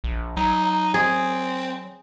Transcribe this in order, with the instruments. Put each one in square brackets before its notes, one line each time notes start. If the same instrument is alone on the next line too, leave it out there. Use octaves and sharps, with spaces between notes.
[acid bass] A#1
[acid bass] F#3 [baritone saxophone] D#4
[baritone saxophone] C4 [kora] G#4